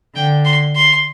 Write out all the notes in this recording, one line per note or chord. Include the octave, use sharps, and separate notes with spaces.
D3 G5
C6
C6